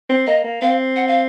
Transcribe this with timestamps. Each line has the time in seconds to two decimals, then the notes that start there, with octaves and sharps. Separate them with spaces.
0.10 C4
0.27 A#3 D#5
0.44 A#3
0.61 C4 F5
0.96 F#5
1.07 F5